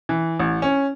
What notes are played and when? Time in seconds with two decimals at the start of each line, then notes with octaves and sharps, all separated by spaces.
0.09 E3
0.40 A1
0.62 C#4